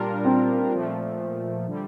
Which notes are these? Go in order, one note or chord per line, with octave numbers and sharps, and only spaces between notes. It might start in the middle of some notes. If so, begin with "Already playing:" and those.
Already playing: A#2 G3 D4 F4 A#4
C4
A#2 F3 A3
D3 G3